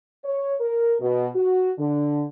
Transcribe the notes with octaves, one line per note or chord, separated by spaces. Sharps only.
C#5
A#4
B2
F#4
D3